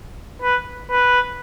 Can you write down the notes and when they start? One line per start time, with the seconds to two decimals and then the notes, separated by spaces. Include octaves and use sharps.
0.42 B4
0.91 B4